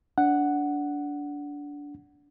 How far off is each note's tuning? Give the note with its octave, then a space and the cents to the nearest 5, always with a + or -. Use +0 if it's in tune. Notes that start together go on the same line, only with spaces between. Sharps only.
D4 -20 F#5 +0